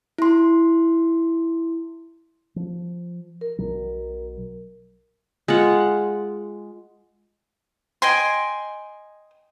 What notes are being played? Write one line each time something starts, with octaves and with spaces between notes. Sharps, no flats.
E4 C6
F3
A#4
B1 B2 F#3
G#3 F4 F#5
D#5 G5 G#5 C6